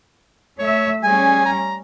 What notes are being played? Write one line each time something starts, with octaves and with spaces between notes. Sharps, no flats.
A3 C#5 E5
G3 C#4 G#4 G#5
A#5